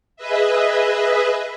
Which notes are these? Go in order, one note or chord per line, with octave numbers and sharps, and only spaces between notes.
G#4 B4 D#5 E5